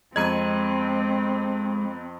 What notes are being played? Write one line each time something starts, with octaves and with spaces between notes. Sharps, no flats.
F2 G#3 C4 D#5 A#5 G#6 D#7